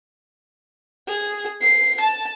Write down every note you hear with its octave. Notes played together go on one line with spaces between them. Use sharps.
G#4
C7
A5